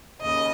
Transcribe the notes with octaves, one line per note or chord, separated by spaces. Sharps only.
D#2 C#3 D#5